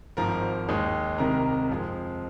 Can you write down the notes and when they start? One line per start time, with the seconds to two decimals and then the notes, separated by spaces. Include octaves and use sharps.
0.17 G#1 G#2 F3 A#4 A#5
0.69 D#2 D#3 G#3
1.18 C2 C3 D#3 G#3 A#4 A#5
1.69 F2 F3 G#3